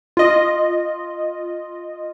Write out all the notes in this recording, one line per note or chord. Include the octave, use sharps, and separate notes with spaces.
F4 D#5